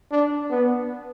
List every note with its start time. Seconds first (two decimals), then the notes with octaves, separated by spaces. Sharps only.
0.11 D4
0.50 B3